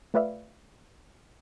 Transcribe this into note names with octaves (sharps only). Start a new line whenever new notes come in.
A3 F4 B4 D5 E5 F5